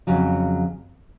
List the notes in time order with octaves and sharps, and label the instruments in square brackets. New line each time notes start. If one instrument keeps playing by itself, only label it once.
[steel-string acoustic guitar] F2 C#3 F#3